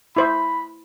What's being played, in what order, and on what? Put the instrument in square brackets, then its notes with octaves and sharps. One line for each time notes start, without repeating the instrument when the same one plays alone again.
[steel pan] E4 C5 E5 [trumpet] B5